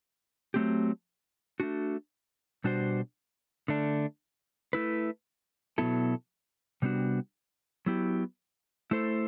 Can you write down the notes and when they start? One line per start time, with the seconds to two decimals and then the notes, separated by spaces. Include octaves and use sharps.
0.54 F#3 A3 C4 G4
1.60 A3 D4 F#4
2.64 B2 G3 D4 F#4 C5
3.68 D3 A3 D4
4.73 A3 E4 B4
5.78 B2 F#3 B3 E4 A4
6.82 C3 G3 B3 D4 F#4
7.86 F#3 B3 E4 G4
8.91 A3 E4 A4 C5